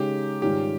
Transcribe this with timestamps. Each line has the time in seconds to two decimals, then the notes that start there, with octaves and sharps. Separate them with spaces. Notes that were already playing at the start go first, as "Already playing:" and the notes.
Already playing: C#3 G#3 D#4 G4
0.42 G#2 D#3 G3 C#4 F4 G4